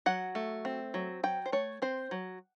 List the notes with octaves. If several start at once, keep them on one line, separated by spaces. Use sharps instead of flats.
F#3 F#5
A3
C4
F#3
F#3 G5
C5
A3 C#5
C4 C5
F#3